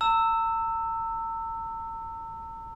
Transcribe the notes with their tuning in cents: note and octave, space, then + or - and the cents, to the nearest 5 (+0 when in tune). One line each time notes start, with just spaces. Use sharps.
A#5 -45 E6 +0